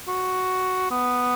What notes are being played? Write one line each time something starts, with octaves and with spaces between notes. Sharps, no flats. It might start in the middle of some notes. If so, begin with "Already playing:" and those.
F#4
B3